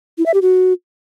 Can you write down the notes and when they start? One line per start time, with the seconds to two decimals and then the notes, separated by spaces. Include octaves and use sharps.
0.18 E4
0.26 E5
0.34 G4
0.42 F#4